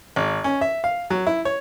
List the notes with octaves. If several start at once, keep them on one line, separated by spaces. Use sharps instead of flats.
G#1
C#4
E5
F5
F#3
E4
C#5